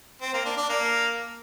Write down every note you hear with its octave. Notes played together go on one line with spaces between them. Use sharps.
C4
A#3
D4
D4
A#3